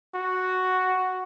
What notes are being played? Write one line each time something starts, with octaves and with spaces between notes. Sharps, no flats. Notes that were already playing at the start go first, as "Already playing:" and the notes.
F#4